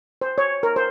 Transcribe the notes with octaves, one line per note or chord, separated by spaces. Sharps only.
C5
C#5
A#4
C5